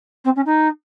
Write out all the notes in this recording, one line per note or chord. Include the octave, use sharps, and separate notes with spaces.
C4
C#4
D#4